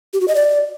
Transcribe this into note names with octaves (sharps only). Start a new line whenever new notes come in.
G4
F#4
D#5
D5